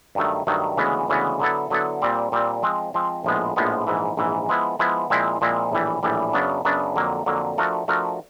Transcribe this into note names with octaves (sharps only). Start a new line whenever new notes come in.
G2 D#3 F#3 A3
G2 D#3 F#3 A3
D2 C#3 E3 G#3 B3
D2 C#3 E3 G#3 B3
D3 F#3 B3 E4 A4
D3 F#3 B3 E4 A4
A#2 G3 C4
A#2 G3 C4
F3 G#3 C4
F3 G#3 C4
A#1 A2 F3 G#3 B3
A#1 A2 F3 G#3 B3
A#1 G#2 E3
A#1 G#2 E3
F3 G#3 B3 E4
F3 G#3 B3 E4
A#2 F3 G#3 C4 E4
A#2 F3 G#3 C4 E4
A#1 A2 E3 G3
A#1 A2 E3 G3
F#2 C#3 F#3 B3 D4
F#2 C#3 F#3 B3 D4
F2 D3 F#3 A#3
F2 D3 F#3 A#3
F3 A3 D4 F#4 A#4
F3 A3 D4 F#4 A#4